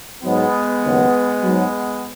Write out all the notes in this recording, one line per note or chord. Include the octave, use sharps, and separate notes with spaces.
G#2 F#3 G#3 B3
D#2 C#3 F#3
G#2 F#3